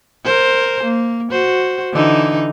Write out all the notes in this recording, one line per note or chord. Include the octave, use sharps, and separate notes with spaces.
A#4 C5
A#3
F#4 C5
D3 E3 D#4